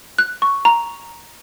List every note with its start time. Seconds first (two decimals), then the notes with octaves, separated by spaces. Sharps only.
0.18 F#6
0.42 C#6
0.65 A#5